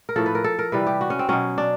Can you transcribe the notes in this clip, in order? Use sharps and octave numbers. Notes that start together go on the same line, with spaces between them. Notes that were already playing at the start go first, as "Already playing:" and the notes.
A#4
A2 F3 A4
B4
A#4
A4
A#4
C3 E3 G3 B4
G4
F#4
C#4
C4
B2 F#3 C#4
D4